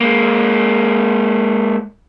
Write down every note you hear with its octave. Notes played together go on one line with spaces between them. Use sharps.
G#3 A#3